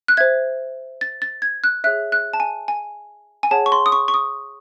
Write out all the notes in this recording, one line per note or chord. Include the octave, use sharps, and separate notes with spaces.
F#6
C5 E5 G#6
A6
A6
G#6
F#6
G#4 C#5 E5 F#6
F#6
A5
G#5
G#5
G#5
G#4 C#5 F#5 A5
C#6
C6
D#6
C#6
C#6
D#6